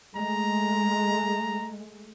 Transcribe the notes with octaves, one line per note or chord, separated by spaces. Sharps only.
G#3 A3 A#5